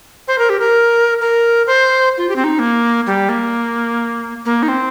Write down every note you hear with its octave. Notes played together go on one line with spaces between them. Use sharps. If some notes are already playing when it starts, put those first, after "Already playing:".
C5
A#4
G4
A#4
A#4
C5
F4
G4
C4
D#4
A#3
G3
A#3
A#3
D#4
C4